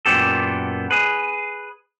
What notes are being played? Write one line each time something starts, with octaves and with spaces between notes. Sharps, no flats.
F#2 A#2 F3 B3 G4 A4
G#4 B4